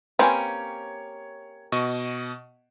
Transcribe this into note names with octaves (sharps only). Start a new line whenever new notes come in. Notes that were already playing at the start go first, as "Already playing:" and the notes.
A#3 C4 C#4 G4 B4 C#5 G#5
B2 D#5 C#6